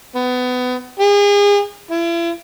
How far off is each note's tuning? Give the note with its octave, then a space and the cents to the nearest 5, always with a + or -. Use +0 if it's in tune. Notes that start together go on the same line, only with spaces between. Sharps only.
B3 +25
G#4 -35
E4 +40